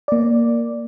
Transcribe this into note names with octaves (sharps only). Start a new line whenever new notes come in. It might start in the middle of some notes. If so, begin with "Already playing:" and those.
A#3 D5